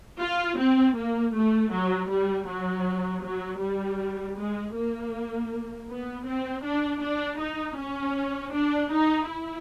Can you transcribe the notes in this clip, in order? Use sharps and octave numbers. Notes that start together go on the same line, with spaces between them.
F4
C4
A#3
A3
F#3
G3
F#3
F#3
G3
G#3
A#3
B3
C4
D4
D4
D#4
C#4
D4
D#4
E4